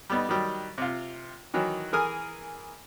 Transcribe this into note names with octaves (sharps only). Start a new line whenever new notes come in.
G3 B3 D#4
D#3 F#3 G3
C3 F4
D#3 E3 F#3
E3 G#4 A#4 G#5 D#6 F6